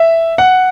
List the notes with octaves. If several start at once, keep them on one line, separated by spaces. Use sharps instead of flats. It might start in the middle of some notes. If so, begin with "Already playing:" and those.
Already playing: E5
F#5